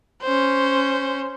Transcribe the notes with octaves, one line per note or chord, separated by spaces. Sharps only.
C#4 C5